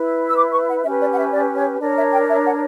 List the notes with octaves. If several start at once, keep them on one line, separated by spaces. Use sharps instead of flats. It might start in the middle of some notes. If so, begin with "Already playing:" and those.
Already playing: E4 B4
E6
D6
C#6
F#5
C#4 G4 B4 E5
D5
F#5
E5
D5
C#5
D4 A#4 C#5 D5
E5
G5
E5
F#5